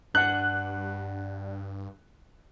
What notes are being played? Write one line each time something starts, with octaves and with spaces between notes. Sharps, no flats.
G2 D4 F#5 F#6